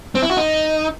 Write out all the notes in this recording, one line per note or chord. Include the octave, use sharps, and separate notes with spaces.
C4
E4
F#4
D#4